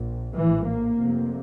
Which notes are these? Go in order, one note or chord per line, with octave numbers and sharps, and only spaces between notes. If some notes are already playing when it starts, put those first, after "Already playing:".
Already playing: A#1 A#2
A#1 A2 E3
A#3
F1 F2 C3